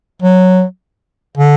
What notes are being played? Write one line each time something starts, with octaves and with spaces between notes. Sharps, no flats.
F#3
D3